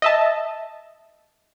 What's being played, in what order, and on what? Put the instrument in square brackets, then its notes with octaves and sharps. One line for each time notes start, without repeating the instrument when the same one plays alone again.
[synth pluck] D#5 E5 A5